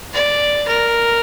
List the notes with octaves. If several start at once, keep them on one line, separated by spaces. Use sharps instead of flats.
D5
A#4